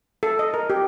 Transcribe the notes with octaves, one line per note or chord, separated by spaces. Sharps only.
A4
D#5
A#4
G4